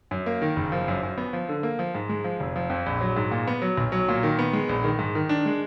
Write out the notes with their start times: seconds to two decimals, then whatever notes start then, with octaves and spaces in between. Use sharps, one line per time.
0.11 F#2
0.26 A#3
0.42 D#3
0.56 F#1
0.72 F3
0.88 F#2
1.03 F#2
1.18 B3
1.33 F3
1.49 D3
1.63 A#3
1.79 F3
1.95 G#2
2.09 G#3
2.24 F3
2.40 F1
2.56 F3
2.70 F2
2.86 A#1
3.01 F#3
3.16 G#2
3.31 A#2
3.47 B3
3.62 F#3
3.77 B1
3.92 F#3
4.08 A#2
4.23 D#3
4.39 B3
4.53 G#3
4.69 A#1
4.84 D#3
4.99 G#2
5.15 D#3
5.29 D4
5.46 G#3